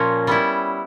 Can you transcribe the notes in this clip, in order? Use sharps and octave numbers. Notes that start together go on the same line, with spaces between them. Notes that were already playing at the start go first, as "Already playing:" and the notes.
Already playing: A#2 F3 A#3 C#4
G3 B3 E4